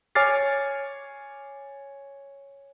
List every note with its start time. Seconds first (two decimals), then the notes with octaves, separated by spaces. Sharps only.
0.15 C#5 G#5 D6 F6 A6 C7